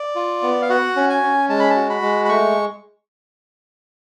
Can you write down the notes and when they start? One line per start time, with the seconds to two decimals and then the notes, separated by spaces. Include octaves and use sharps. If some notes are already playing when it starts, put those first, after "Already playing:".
Already playing: D5
0.16 F4
0.43 B3
0.62 F5
0.70 F#4 F#5
0.96 C#4
1.10 G#5
1.23 C#4
1.49 G#3 A5
1.60 B5
1.70 A5
1.76 F#4
1.90 B5
2.02 G#3
2.25 B5
2.29 A3 C#6